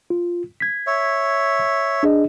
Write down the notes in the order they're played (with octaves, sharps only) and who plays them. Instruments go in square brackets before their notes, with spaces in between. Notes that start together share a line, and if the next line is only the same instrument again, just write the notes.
[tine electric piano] F4
G#6 B6
[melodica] C#5 E5
[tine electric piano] D4 G#4 D#5